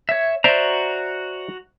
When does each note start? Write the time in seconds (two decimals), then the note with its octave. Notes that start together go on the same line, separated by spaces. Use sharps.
0.09 C#5 E5
0.44 F#4 C5 D5 E5 A#5